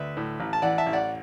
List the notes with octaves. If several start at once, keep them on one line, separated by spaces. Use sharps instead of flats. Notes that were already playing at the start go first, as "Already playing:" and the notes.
Already playing: D2 B4 E5
A2
A1
A5
E3 D5 F#5
E5 A5
A1
D5 F#5